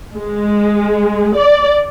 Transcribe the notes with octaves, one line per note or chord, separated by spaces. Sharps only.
G#3
D5